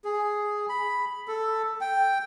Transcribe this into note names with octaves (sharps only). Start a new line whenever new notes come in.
G#4
B5
A4
G5